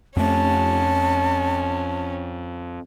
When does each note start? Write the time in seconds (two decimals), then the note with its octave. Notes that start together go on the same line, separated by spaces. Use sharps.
0.17 F2 A3 C#4 A5